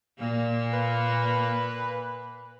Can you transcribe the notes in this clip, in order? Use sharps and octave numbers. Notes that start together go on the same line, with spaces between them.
A#2 A#3
B4